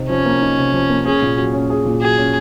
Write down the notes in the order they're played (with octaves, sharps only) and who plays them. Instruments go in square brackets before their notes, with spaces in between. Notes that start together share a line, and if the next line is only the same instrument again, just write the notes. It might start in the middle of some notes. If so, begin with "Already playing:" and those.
Already playing: [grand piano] C3 D#4
[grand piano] F3 [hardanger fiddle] C#4
[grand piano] A#3
D#4
C3
F3
A#3
[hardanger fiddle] C#4 [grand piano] G#4
[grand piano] A#2
F#3
C#4
G#4
A#2
[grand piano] F#3 [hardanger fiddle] G#4
[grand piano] C#4